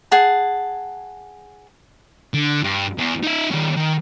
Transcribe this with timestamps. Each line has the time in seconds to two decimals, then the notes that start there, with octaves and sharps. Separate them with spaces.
0.11 G#4 F#5 A5
2.34 D3
2.63 G2
2.98 E2
3.23 D#4 E5
3.51 D#3 C#4
3.76 D#3